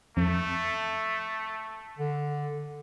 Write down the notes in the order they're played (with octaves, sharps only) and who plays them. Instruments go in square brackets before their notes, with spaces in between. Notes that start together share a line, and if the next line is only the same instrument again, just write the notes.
[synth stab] F2 [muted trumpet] A3
[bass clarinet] D3